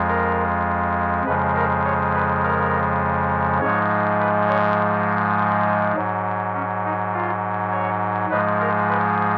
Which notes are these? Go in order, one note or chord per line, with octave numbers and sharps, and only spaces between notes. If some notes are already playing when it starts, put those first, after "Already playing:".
Already playing: F2 F3 G#3
A#4
F2 C#3 F3 G#3 B4
A#4
C#5
B4
A#4
G#2 F3 G#3 C#5
B4
C#5
G#2 F#3
C#4
D#4
F4
C#5
G#2 F3 G#3 B4
A#4
B4